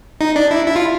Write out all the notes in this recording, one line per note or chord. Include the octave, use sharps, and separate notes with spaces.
D#4
D4
E4
E4
F4